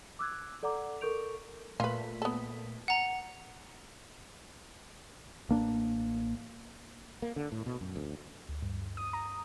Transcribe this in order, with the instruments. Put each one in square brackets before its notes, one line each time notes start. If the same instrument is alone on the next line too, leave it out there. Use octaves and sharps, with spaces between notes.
[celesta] D6 E6 F#6 G#6
A4 D5 F#5 A#5 D6
A4 A#4 C#6 G6 D7 F7
[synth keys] A#2 A3 B6 [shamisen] F4 B4
[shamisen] B3 A4
[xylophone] F#5 A#5
[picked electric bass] A1 A#3 D4
[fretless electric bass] A#3
D3
A2
B2
F#2
D2
[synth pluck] D2
G2
D#6
A#5